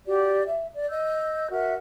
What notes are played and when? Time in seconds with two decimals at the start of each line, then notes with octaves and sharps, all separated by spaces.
0.06 F#4 G4 D5
0.47 E5
0.73 D5
0.90 D#5 E6 G6
1.51 F#4 A#4 E5